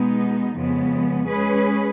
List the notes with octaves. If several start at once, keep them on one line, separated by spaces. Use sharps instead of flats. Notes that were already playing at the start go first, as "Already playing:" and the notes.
Already playing: B2 G#3 B3 D#4
F2 C#3 F3 G#3 B3
G#3 C#4 G#4 B4